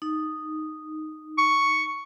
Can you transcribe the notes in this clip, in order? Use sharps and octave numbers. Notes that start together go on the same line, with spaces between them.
D#4
C#6